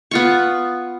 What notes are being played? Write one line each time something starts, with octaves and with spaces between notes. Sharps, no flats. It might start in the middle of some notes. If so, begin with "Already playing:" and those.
B3 F4 C#6